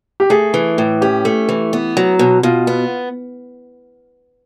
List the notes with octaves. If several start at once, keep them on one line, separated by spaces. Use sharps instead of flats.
G4
A3 G#4
E3
A2
C#4 G4
A3
E3
B3
F#3
B2
B2 F4
B3